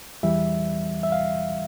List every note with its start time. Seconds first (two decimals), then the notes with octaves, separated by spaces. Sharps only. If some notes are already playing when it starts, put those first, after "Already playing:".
0.23 E2 E3 G3 E5
1.03 E5
1.12 F5